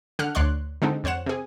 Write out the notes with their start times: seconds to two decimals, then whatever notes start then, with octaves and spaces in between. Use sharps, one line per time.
0.19 D3 F#5 F6 F#6
0.35 D2 C#5 D5 C6 F#6
0.82 D3 G#3 C4 D4 D#4
1.04 F2 C5 C#5 F#5 E7
1.26 C3 G#4